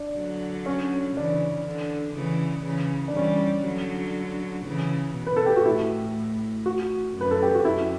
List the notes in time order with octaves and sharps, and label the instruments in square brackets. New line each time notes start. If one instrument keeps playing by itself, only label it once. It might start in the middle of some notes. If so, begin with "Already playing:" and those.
Already playing: [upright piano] D4
[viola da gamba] D3 F#3
[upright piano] C#4
[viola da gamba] C#3 E3 [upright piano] D4
[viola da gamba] D3
C#3 E3
C#3 E3
[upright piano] D4
[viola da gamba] E3 G3 [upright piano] C#4
[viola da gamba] D3 F#3
C#3 E3
B2
[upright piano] B4
A4
G4
F#4
[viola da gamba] A2 [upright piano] E4
[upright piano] F#4
[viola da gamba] F#2
[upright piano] B4
A4
G4
F#4
[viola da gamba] F#2 [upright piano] E4